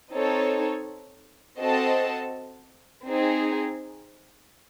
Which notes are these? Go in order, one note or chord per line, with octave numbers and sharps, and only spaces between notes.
C4 D#4 A4 C#5
C4 F#4 A4 D#5 A5
C4 D#4 G#4